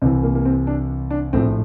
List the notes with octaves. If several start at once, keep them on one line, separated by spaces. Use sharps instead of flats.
C2 C3 E3 C4
A#3
A#3
C4
D4
D4
A#1 A2 F3 C4